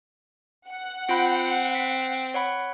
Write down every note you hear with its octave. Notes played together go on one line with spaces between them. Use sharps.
F#5
C4 F4 B5
B6
C#5 F#5 B5